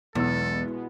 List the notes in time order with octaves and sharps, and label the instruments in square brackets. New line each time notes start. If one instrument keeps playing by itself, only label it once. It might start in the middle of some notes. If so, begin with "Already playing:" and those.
[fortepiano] B1 E6 [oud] E2 [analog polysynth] B2 G#3 B3 [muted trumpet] A4